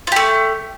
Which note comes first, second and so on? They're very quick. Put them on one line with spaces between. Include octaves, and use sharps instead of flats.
F4 G4 A3